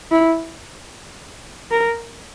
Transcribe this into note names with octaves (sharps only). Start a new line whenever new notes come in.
E4
A#4